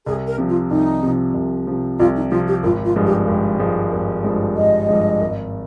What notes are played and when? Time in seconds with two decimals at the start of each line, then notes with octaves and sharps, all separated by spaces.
0.06 C2 G#4
0.27 A#4
0.38 C3 F3
0.49 F4
0.71 C2 D#4
1.02 C3 F3
1.34 C2
1.67 C3 F3
1.99 C2 F4
2.15 D#4
2.31 C3 F3 F4
2.47 G4
2.63 G#1 F4
2.85 F4
2.96 G2 F3 G#3
3.06 G4
3.28 G#1
3.59 G2 F3 G#3
3.92 G#1
4.24 G2 F3 G#3
4.56 G#1 D#5
4.89 G2 F3 G#3
5.21 G#1